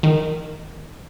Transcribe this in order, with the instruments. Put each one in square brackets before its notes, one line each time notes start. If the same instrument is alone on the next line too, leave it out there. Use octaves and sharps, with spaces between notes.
[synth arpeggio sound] D#3